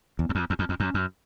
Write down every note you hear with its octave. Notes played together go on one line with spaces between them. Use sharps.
E2
E2
F2
E2
F2
F2
F#2
F#2